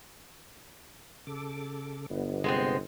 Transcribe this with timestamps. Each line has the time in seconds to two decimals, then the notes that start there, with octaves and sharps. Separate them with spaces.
1.27 C#3 A4 D6
2.10 G1 G3 B3
2.44 C3 G#3 B3 C4